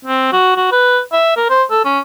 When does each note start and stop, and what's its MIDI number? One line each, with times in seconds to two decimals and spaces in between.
0.05 0.31 60
0.33 0.53 66
0.56 0.67 66
0.72 1.00 71
1.12 1.32 76
1.37 1.47 70
1.50 1.63 72
1.71 1.82 69
1.85 1.99 61